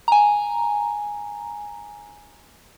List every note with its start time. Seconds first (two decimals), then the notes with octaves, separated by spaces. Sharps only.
0.08 G#5 A#5